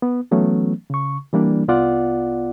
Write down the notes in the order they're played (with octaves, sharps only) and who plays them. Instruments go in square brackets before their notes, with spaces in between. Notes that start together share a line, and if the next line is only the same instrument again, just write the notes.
[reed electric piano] B3
E3 F#3 A3 B3 C#4
C#3 C#6
E3 G3 A#3 D4
C2 B3 F4 D5 F#5